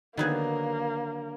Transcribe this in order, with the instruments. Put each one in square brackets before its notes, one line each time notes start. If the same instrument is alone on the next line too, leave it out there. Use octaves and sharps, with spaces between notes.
[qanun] D3 F#3 [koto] D#3 B3 G#4 [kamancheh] A#3